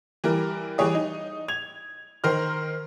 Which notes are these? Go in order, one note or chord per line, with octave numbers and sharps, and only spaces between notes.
E3 G3 A#4
E3 G3 G#4 C#5 D#6
D#4
G#6 F7
D#3 A#4 C5 F6